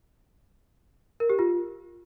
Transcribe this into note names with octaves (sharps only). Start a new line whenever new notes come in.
A#4
G4
F4